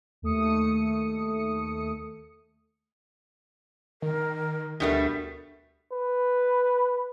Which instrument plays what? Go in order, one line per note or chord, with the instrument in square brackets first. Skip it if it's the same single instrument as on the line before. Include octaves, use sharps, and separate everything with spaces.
[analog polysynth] D#2 A3 D#6 C#7
[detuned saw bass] D#3 [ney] A#4
[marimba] D2 D4 A#4 [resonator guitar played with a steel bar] B2 G3 A3 [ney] B4
[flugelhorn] B4